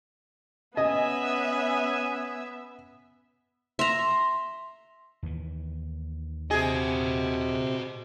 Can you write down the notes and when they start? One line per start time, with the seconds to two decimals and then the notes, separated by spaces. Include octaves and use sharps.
0.77 B3 C#4 D#5 E5 G#5
3.79 E5 A#5 C6
5.23 D#2 E3
6.51 C3 F#4 G#4 D#5